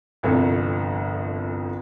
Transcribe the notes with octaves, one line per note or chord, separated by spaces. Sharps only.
G1 C2 F2 A4